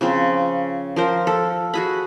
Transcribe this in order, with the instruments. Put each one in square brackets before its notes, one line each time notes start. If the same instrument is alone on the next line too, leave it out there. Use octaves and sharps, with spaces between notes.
[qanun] C#3 F3 C4
F3 A#4 C5
A4
F#4 G#4 B5